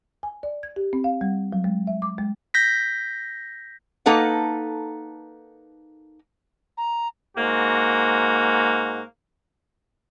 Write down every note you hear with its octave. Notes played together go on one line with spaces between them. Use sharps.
G#5
D5
G#6
G4
C4
F5
G3
F#3
G#3
E5
D6
G#3
G6 A#6 B6
A#3 D#4 A4 B4 F#5
A#5
G#2 A#3 F#4